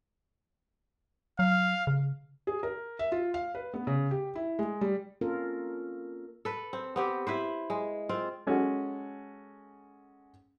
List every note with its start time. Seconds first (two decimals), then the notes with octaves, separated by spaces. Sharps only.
1.39 F#3 F5
1.87 C#3
2.47 G#4
2.63 A#4
2.99 E5
3.12 F4
3.34 F5
3.55 B4
3.74 B3
3.87 C#3
4.11 G4
4.35 E4
4.59 G#3
4.81 G3
5.21 A#3 C4 C#4 F4 A4 A#4
6.45 A4 B4
6.73 C4
6.96 B3 C4 G4
7.27 E4 B4 C5
7.70 G#3
8.09 C4 F4
8.47 G#3 C#4 F#4 A4